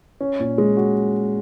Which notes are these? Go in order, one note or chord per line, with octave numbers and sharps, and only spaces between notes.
C#4
A#2
G#3
F#4